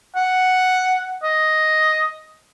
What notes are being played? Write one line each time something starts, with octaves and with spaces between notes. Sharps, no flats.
F#5
D#5